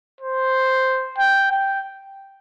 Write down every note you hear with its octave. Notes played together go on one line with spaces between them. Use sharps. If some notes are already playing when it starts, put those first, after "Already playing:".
C5
G5
G5